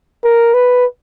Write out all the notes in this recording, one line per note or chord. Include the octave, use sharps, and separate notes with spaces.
A#4
B4